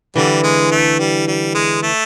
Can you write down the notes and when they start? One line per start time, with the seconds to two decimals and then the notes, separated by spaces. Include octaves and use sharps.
0.16 D3 E3 G3
0.43 G#3
0.71 A3
0.99 G3
1.27 G3
1.55 G#3
1.83 A3